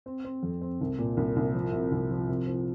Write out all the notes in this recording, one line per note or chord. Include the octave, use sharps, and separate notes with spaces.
C4
C4
F2
C4
C2
A#2
C2
C2
F3
C3
C2
F3
C3
F3